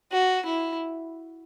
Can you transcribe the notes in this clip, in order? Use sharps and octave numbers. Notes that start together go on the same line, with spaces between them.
F#4
E4